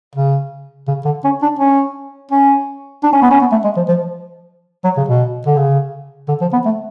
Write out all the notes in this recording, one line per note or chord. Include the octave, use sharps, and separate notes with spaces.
C#3
C#3
D3
C#4
D4
C#4
C#4
D4
C#4
B3
C#4
B3
A3
G#3
F3
F3
F#3
C#3
B2
D3
C#3
D3
F3
B3
A3